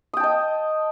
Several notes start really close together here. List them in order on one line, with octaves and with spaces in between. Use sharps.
D#6 G5 A5 D#5